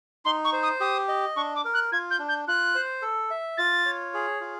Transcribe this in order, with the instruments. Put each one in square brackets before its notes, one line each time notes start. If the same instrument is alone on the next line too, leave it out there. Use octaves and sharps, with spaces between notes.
[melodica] D#4 [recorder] C6
[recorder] C#6
[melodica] C5
[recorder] D#6
[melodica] G4 [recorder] D#6
[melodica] D#5
[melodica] D4 [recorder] C#6
[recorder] D6
[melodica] A#4
[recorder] F#6
[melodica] F4 [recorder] G#6
[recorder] G6
[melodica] D4
[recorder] G6
[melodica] F4 [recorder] F#6
[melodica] C5
A4
E5
[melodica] F4 [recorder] A6
[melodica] C#5
G#4
F4